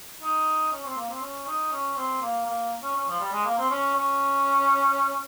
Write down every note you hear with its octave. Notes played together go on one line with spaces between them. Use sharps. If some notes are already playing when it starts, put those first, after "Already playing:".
D#4
C#4
C4
A#3
C4
C#4
D#4
C#4
C4
A#3
A#3
C#4
C#4
F3
G3
G#3
A#3
C4
C#4
C#4